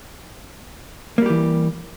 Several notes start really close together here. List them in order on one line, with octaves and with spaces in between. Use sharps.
A#3 G3 G4 E3